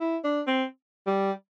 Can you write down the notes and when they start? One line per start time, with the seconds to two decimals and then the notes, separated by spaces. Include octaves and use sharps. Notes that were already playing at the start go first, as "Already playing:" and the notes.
0.01 E4
0.24 D4
0.47 C4
1.07 G3